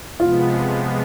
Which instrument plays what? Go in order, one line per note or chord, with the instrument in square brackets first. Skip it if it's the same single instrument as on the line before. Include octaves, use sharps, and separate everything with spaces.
[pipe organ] C3 F3 G#3 B3 [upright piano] F4